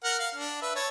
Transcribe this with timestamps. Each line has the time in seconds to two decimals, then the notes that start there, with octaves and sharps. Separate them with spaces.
0.04 A#4 F#5 F6
0.19 F5
0.35 D4
0.62 B4 E5
0.75 C#5 A5